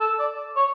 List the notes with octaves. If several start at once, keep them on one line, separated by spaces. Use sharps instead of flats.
A4
D5
C#5